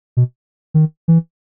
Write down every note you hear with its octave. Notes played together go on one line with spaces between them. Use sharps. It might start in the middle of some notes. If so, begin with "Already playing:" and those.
B2
D#3
E3